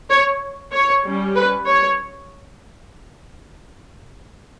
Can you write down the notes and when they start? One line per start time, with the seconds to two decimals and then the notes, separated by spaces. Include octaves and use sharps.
0.10 C#5
0.72 C#5
1.03 G3 C#4
1.35 B4
1.66 C#5